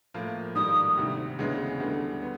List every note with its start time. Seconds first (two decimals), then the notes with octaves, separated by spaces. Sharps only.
0.14 A2 F3 A#3
0.55 G#2 D#3 G3 A#3 D#6
0.97 D2 C3 D#3
1.39 D2 C#3 E3 G#3 B3
1.80 D2 D3 G3 B3 D4
2.22 B3